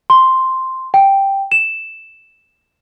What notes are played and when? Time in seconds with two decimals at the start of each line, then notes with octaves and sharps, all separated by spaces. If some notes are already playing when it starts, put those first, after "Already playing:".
0.10 C6
0.94 G5
1.52 E7